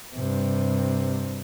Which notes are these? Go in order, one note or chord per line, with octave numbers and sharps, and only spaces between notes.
G2 C3